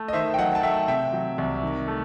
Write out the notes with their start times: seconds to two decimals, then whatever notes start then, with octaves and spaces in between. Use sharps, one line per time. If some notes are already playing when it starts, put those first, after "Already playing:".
Already playing: A3
0.08 D#5
0.13 D#3 C5 E5
0.34 G5
0.38 F#3 D#5 F#5
0.55 A5
0.63 A3 E5 G5
0.88 C3 E5 G5
1.13 F#3
1.38 C2
1.63 D#3
1.88 A3